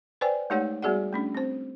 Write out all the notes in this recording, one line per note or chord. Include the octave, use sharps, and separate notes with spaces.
B4 C5 D5 G5 G#5
G#3 A3 D#4 G4 C#5 F#5
G3 B3 F#4 G#4 D5 F#5
A3 C#4 D4
C4 C5